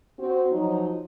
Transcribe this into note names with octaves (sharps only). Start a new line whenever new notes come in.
C4 F#4
F3 F#3 D#4